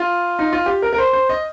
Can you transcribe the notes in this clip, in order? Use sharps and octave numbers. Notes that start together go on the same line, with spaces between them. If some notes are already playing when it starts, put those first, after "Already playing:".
Already playing: F4
D#4
F4
G4
A#4
A#4
C5
C5
D#5